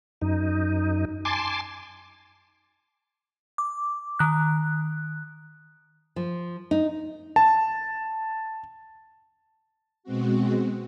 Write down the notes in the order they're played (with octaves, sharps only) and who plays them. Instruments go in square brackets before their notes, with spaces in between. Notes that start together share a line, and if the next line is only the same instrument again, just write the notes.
[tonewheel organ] F#2 D#4
G#5 A5 C6 D6
[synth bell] D6
D#3 F#6
[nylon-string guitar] F3
D#4
[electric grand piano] A5
[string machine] B2 G#3 C4 F#4